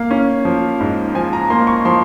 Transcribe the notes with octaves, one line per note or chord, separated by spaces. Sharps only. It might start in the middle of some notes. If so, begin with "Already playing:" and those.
Already playing: A#3 F5
C#4
F3
G#2
F3 G#5
A#5
A#3 C6
C#6
F3 C6